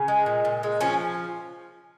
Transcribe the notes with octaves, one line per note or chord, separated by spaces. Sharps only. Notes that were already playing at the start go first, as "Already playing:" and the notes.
Already playing: C#3
G#3
A#2
A#2
G#3
F3 C#4